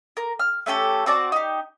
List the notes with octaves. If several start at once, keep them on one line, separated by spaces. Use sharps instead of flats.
A#4
F6
A3 C#4 G4 A4
C4 F#4 D5 A5
D#4 G4